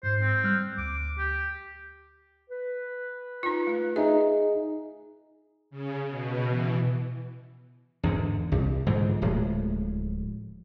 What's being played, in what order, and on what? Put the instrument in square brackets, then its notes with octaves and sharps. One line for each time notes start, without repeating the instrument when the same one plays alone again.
[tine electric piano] G#2 [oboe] C5
[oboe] C4
[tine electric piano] G3 F6 F#6
[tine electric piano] D2 [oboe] D6
[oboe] G4
[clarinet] B4
[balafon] D#4 F4
A3
[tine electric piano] D#4 G#4 [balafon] E5
[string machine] C#3
B2
E3
[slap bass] E2 G#2 D3
C2
G#2 D3 E3 F3
D1 A2 F3 G#3